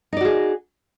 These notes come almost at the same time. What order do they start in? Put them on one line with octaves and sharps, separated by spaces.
D#4 D5 F#4 G#4